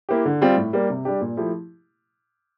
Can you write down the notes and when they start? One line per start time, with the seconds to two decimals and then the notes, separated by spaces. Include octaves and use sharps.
0.09 A#3 E4 G4
0.25 D3
0.41 G3 C4 F4
0.57 A2
0.73 G3 A#3
0.90 C3
1.05 G3 D4 G4
1.21 A#2
1.37 F3 A3 E4 G4